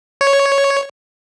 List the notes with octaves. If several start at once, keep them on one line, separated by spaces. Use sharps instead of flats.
C#5